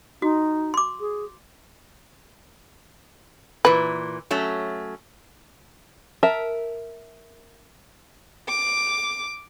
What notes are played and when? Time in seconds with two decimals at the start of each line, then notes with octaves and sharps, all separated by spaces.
0.22 D#4 F#4
0.74 C6 D6
1.00 G#4
3.65 A#2 E3 B4
4.31 F#3 A3 C#4
6.23 A#4 E5 A5
8.48 D6